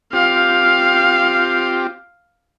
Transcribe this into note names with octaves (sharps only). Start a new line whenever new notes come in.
C4 F4 G4 F5